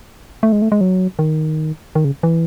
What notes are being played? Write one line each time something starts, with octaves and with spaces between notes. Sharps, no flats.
A3
G#3
A3
G#3
F#3
D#3
D#3
C#3
E3